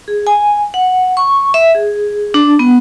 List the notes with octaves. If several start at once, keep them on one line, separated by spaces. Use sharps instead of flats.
G#4
G#5
F#5
C#6
E5
G#4
D4
B3